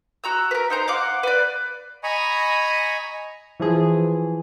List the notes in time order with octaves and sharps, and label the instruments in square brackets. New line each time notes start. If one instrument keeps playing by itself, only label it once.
[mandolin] F#4 A#5 E6
A#4 B4
D#4 C5 A#5
F5 F#5 D6
B4 D5
[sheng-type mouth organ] D#5 G#5 A#5 B5 C#6
[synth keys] E3 F3 G#4